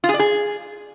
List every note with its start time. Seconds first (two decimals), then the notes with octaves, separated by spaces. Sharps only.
0.04 F4
0.09 G#4
0.14 D5
0.19 G#4